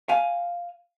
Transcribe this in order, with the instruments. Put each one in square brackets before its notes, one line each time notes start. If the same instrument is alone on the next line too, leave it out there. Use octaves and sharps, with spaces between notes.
[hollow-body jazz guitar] F5 G#5